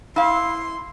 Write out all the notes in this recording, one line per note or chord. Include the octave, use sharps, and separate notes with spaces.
E4 F5 C6